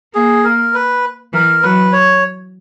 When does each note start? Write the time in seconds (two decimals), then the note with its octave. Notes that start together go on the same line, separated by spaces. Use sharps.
0.14 A#3 G#4
0.44 A#4
0.74 B4
1.33 E3 A#4
1.63 F#3 B4
1.93 C#5